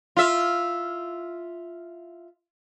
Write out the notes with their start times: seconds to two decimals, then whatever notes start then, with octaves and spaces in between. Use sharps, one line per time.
0.17 F4 E5